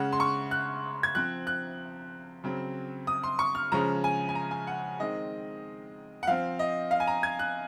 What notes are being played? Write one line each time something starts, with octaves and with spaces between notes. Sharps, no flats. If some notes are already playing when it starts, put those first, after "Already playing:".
Already playing: C#3 G#3 C#4 F#5
C6
C#6
F#6
G#6
F3 C4 F#6
F#6
C#3 F#3 C4
D#6
C6
C#6
F6
C#3 F3 G#3 C#4 A#5
G#5
G#5
A#5
G#5
F#5
D#3 G#3 C4 D#5
F#5
F3 C4 F5
D#5
F5
G#5
A#5
G#6
F#6